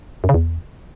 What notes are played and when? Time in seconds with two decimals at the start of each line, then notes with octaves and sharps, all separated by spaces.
0.24 F#2
0.29 C#3
0.34 E2